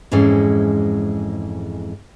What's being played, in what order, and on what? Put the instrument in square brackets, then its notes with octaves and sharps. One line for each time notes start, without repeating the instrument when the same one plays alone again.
[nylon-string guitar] F2 G#2 E3 G#3 C#4